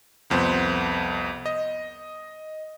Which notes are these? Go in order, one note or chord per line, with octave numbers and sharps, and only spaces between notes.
C2 F2 B3 C5
D#5